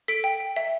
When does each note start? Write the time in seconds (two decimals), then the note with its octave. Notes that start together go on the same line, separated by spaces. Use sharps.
0.08 A4 B6 D7
0.24 G5
0.40 G5
0.57 E5